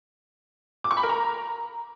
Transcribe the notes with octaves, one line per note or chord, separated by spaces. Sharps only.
D6
C#6
B5
A#4
A#5